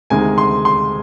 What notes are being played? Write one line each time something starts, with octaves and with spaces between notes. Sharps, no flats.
D2 C3 D#3 G#3 G#5
C6
C6